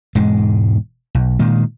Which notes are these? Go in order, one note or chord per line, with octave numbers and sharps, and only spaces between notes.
E1 G#2 G#3
B1
A#2 D#3 G#3